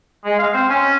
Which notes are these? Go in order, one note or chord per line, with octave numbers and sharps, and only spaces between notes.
G#3
F5
C4
C#4